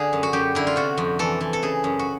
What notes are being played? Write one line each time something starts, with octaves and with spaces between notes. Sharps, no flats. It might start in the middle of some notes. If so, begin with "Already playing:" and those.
Already playing: D3 G#4
F#2
F#4
F#2 G4
D3 E4
F4
C3 F#4
F2
E3 A4
E3
A4
C#3 G#4
F#2
F#4